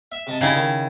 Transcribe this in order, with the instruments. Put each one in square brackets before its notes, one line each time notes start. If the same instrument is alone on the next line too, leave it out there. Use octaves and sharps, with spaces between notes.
[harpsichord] E5
C3 D#5 A5
[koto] C#3 E4 [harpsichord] D#4 G4 D5
[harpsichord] D#3